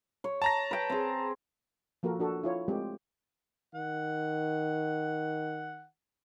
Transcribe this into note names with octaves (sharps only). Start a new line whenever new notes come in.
C#5
A5 A#5 A#6
B4 G5
C4 G#4
F3 A#3 F#4 A4 A#4
D4 F#4 A4
E4 F4 C#5
G#3 A3 C4 G4
D#3 F#5